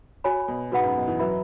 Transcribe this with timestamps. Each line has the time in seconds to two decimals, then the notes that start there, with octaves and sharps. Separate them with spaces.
0.24 F#4 C#5 G#5 B5
0.48 B2
0.72 G#2 F#4 B4 F#5 B5
0.83 F#2
0.96 B2
1.08 E3
1.20 F#3 B4 E5 B5